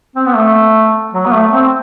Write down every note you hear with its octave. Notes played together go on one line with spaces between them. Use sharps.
C4
B3
A3
F#3
B3
A3
C4